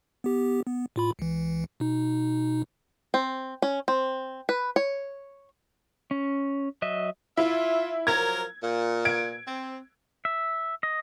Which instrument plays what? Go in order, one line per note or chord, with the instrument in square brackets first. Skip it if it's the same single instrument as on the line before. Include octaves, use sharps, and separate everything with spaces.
[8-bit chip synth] B3 G4
B3
A2 F4 B5
C#2 E3
B2 D#4
[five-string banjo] C4
C#4
C4
B4
C#5
[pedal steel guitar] C#4
F#3 D#5 E5
[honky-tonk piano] E4 [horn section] F4 E5
[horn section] F3 F#3 A#4 [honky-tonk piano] G#6
[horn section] A#2
[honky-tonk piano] G#6 D7
[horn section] C4
[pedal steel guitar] E5
D#5